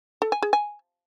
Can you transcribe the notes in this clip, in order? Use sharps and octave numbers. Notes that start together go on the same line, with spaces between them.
A4
G#5
G#4
G#5